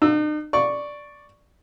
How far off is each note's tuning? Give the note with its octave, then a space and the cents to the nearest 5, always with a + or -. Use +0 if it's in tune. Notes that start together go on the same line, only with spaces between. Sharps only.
D#4 -45 E6 +0
D5 +0 C#6 +0